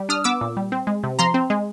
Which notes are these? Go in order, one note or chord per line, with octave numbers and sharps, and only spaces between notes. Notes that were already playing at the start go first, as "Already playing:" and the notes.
Already playing: G3
D4 D#6 F6
B3 D6 E6
A#2
G3
C4
G#3
C3
F3 A#5 C6
C4
G#3